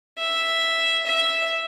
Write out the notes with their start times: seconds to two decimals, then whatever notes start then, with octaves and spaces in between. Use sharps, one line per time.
0.19 E5
1.06 E5